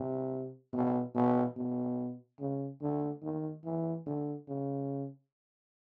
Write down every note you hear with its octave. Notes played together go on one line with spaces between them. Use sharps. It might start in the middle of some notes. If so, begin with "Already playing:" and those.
Already playing: C3
B2
B2
B2
C#3
D3
D#3
E3
D3
C#3